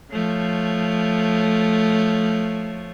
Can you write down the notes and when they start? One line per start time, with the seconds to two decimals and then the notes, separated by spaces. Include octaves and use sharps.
0.11 F3 A3 C#5